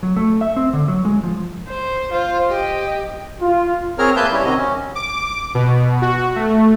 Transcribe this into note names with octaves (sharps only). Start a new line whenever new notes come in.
F#3
A3
E5
C4
D3
F#3
G#3
F3
C5
F4 C5
G4 D#5
F4
C4 G#4 A#4 C#5 A#5 F6
A#3 B4 E5 A5 C6 G6
G3 C#4 E4 G4 C#5
C3 D#3 C4 F#4 D#5
C#4
D6
B2
F#4
A3